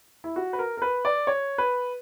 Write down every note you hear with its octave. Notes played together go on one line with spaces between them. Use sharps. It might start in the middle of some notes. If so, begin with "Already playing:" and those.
E4
F#4
B4
A#4
A#4
B4
D5
C#5
B4